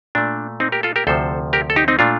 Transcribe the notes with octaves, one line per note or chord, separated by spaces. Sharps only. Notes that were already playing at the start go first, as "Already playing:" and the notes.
A#2 A3 D4
C4 D#4
G4 A#4
F4 A4
G4 A#4
D2 C3 F3 A4 C5
G4 A#4
A4
D#4 G4
C4 D#4
A#2 A3 D4 F4